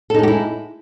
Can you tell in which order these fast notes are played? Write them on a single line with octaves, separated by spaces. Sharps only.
A4 D#4 G#3 G4 E4